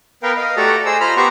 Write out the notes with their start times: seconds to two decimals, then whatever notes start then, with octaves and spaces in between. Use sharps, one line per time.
0.23 B3 A#4 B4 F5 G5
0.37 D#5 F5
0.57 A3 F#4 G4 A4 D5 A#5
0.86 G#4 C5 D#5 E6
1.01 F4 C5 A#5 B5 F6
1.17 B3 G4 C5 F#5 A#5 C#6